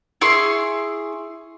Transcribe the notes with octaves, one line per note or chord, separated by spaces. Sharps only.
E4 G#4 C6 C#6